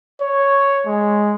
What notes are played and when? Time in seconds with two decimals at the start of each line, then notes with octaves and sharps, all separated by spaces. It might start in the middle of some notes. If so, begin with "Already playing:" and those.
0.21 C#5
0.86 G#3